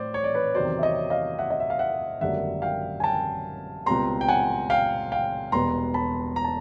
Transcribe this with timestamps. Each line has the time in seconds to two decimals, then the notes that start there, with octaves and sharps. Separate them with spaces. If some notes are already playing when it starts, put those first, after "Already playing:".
Already playing: A2 C5 D5
0.14 C#5
0.24 D5
0.34 B4 C#5
0.55 E2 C3 D#3 F#3 C5 D5
0.79 E5
0.83 C#5 D#5
1.10 D#5 F5
1.38 E5 F#5
1.50 D#5
1.60 E5
1.70 F5
1.79 E5 F#5
2.21 G#1 F#2 D3 G3 A#3 E5 F#5
2.62 F5 G5
3.00 G#5
3.04 G5 A5
3.86 C#2 B2 G3 C4 A#5 C6
4.21 G5
4.28 F#5 G#5
4.70 F5 G5
5.12 F5 G5
5.52 E1 E2 B2 G3 B3 A#5 C6
5.94 A5 B5
6.36 A#5
6.44 A5